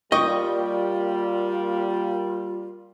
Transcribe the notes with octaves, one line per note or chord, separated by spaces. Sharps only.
G3 A#3 F4 D#5 G5 C#6